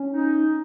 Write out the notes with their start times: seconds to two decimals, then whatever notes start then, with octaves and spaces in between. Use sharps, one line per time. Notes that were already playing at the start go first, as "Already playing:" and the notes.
Already playing: C#4
0.13 D#4